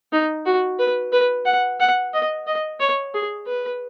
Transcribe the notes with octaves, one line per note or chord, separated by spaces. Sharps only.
D#4
F#4
B4
B4
F#5
F#5
D#5
D#5
C#5
G#4
B4